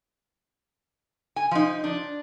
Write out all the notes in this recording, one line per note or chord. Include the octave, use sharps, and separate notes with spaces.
G#5
F3 D#4
D4